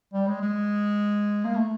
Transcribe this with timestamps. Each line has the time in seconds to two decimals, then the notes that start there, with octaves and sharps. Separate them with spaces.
0.14 G3
0.28 G#3
0.42 G#3
1.45 A#3
1.56 A3